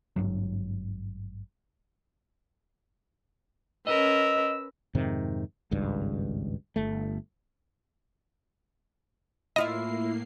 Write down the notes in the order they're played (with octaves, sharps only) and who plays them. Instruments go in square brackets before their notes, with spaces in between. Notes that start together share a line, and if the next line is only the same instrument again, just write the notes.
[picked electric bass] G#1 E2 G2 F#3
[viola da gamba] C#4 A#4 B4 [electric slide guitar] D#5 [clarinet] E6
[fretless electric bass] F2 G#2 C3 D#3
G#1 C#2 G2
G1 A3
[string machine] A2 A#3 C7 [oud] E4 F4 E5 [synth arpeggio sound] D#5